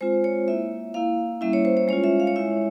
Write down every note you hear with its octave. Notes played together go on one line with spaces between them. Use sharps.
G#3 C4 F4 C5
C#5
A#3 E4 E5
A#3 E4 F5
G3 A#3 C#4 E4 E5
C#5
C5
C#5
G#3 C#4 F4 C#5
E5
F5
C#5
G#3 E4 E5